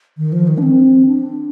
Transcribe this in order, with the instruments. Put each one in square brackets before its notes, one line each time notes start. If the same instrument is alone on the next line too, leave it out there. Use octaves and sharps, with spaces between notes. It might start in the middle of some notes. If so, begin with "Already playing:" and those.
[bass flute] D#3
F3
D#3
D4
C4
D4